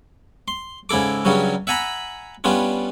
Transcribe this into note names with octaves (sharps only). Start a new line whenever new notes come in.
C6
G#2 C#3 E4 A4 D6
G2 C#3 F#3 G3 C#4
E5 F#5 G#5 A#5 B5
G3 B3 C#4 D4 F4